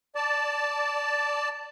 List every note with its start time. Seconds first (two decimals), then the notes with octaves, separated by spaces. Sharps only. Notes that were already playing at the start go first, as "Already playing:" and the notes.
0.15 D5 A5